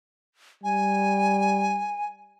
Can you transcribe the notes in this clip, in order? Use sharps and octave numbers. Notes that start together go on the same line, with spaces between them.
G3 G#5